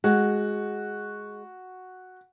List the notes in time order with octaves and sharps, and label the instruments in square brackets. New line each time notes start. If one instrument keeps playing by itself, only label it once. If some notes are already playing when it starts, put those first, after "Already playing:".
[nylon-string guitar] G#3 [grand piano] F#4